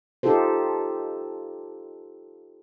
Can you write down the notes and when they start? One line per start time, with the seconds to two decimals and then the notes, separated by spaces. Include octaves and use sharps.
0.23 D#4 F4 G4 A4 C5